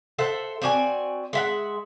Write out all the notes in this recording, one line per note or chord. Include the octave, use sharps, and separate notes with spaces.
A4 C5 E5 F#5
C4 F#4 D5 G#5
G#3 E5 F#5